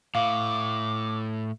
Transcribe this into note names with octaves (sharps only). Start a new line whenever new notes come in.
A2 F5 D6